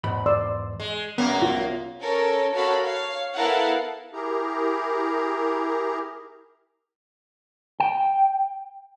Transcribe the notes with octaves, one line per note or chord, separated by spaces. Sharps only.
E2 G#2 B5
D5 C6 E6
G#3
C2 F#2 A#3 B3 A#4
F4
C#4 A4 A#4 C#5
F#4 A4 A#4 C#5 F5 B5
C#5 F5
B3 E4 A4 A#4 F5 F#5
E4 G4 G#4 A#4 A#5
G5